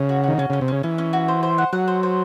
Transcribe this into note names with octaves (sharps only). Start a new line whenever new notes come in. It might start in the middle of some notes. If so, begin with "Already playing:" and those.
Already playing: C#3
F#4
D#3 F#4
C#3 C#4
C#3 C#4
C3
C#3 C#4
E3 C#4
C#4
F#4
C5
C5
F#5
F#3 F#5
C5
C5